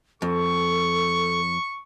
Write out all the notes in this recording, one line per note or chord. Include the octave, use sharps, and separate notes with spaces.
F2 A4 C#6